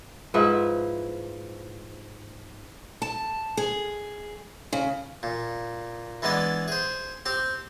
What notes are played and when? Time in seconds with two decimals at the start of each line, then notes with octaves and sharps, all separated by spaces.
0.34 G#2 F3 E4 B4
3.02 A5
3.57 G#4
4.73 C#3
5.23 A#2
6.22 E3 G#3 B3 D4 D5
6.68 G#4 C5
7.26 C4 G4 C6